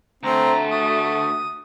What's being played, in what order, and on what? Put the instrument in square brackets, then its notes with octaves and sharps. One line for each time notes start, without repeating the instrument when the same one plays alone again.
[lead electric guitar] D2 [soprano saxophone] A3 [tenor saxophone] C4 [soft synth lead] A#5
[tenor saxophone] F#4 [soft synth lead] D#6